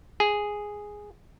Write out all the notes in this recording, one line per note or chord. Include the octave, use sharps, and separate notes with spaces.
G#4